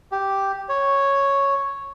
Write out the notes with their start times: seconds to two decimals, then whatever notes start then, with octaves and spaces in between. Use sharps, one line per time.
0.12 G4
0.69 C#5